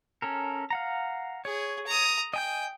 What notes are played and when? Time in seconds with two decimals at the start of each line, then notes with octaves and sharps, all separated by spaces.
0.22 C#4 A4 A#4
0.70 F5 F#5 A#5
1.45 G#4 C#5
1.87 A#5 D#6
2.34 D#5 G5 G#5 G6